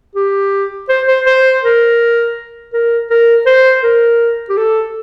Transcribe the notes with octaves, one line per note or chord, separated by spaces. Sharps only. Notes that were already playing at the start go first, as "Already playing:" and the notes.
G4
C5
C5
C5
A#4
A#4
A#4
C5
A#4
G4
A4